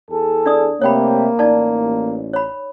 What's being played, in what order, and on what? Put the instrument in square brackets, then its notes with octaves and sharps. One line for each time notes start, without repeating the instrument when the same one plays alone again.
[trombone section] E2 G#4 A4
[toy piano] D4 D5 D#6
[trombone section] C3 A3 G4 [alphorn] A#3 [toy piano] C#5 G5 B5
[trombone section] A1 [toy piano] D#4 D5 A5
[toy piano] C#5 B5